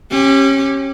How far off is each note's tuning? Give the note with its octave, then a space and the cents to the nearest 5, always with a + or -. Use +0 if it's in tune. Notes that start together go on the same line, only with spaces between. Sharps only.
C#4 -25 G4 +0